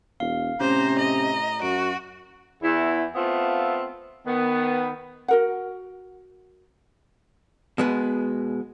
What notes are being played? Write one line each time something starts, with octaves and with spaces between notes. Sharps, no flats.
E1 F5
A2 C3 C#4 C5 A#5
D#5
F#2 F#4 D7
E2 E4
A3 B3 C4 F4
D#3 B3
F#4 A#4 F#5
B2 G#3 B3